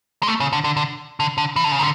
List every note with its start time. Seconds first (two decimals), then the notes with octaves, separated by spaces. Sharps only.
0.23 G#3
0.28 A3
0.40 C#3
0.53 D3
0.64 D3
0.77 D3
1.20 D3
1.38 D3
1.56 E3
1.64 D3
1.72 C#3
1.79 D3